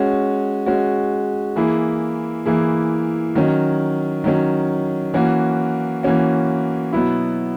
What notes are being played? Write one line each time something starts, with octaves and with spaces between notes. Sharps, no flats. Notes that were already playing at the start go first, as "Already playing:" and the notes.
Already playing: G#3 C#4 F#4
G#3 C#4 F#4
E3 A#3 E4 G#4
E3 A#3 E4 G#4
D#3 F#3 C#4
D#3 F#3 C#4
E3 A#3 C#4 F#4
E3 A#3 C#4 F#4
B2 F#3 B3 E4